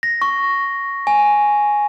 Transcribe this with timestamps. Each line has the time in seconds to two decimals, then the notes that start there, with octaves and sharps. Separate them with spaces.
0.03 A#6
0.22 C#6
1.07 G#5